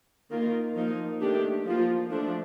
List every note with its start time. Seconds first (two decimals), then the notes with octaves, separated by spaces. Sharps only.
0.30 D#3 A#3 F4 A#4
0.75 F3 A#3 D#4 A#4
1.21 D#3 A3 D4 G4
1.65 F3 A#3 F4
2.11 F3 A3 D4